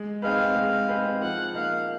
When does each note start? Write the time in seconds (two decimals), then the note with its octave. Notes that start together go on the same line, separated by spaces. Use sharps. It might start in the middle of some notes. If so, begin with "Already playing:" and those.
Already playing: G#3
0.22 C4 D#4 G#4 B4 F5
0.56 G#3
0.88 C4 D#4 G#4 B4
1.21 F3 F#5
1.55 A#3 D#4 F5